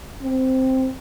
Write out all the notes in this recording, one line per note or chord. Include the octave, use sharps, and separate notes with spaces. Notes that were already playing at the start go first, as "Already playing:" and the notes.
C4